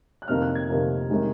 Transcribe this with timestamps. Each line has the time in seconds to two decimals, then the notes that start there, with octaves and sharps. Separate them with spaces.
0.22 F#6
0.28 F2 C3 D#3 A#3 D#4 F6
0.42 F#6
0.55 G#6
0.70 F2 C3 D#3 A#3 D#4
1.10 C3 D#3 G#3 D#4